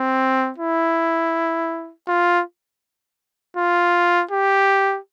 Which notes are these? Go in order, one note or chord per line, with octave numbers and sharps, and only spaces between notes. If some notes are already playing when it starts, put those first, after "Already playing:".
Already playing: C4
E4
F4
F4
G4